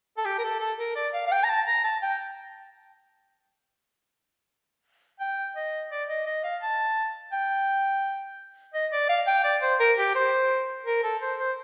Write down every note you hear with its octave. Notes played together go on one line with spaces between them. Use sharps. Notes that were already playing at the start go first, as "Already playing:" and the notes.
A4
G4
A#4
A4
A4
A#4
D5
F5
F5
G5
A#5
A5
A#5
A5
G5
G5
D#5
D5
D#5
D#5
F5
A5
G5
D#5
D5
F5
G5
D5
C5
A#4
G4
C5
A#4
A4
C5
C5